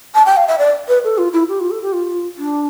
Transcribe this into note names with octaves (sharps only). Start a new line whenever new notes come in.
A5
G5
F5
E5
D5
B4
A4
F4
E4
G4
F4
A4
G4
F4
D4